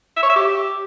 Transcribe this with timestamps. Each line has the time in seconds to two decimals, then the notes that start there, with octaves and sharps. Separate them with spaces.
0.17 E5
0.23 C#5
0.29 E5
0.36 G4